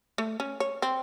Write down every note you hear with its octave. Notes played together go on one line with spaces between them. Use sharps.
A3
C#4
C#5
C4